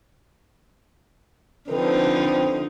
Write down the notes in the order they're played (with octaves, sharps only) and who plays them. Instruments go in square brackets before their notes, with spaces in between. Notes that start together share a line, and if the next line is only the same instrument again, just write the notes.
[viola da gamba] D3 F3 D#4 [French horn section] C4 A4 B4